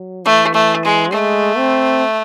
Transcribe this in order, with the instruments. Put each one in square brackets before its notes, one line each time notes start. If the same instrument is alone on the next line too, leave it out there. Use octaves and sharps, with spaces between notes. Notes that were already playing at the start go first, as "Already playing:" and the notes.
Already playing: [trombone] F#3
[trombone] E3 [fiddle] A3
[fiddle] A3
G#3
[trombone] G#3 [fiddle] A3
[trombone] C4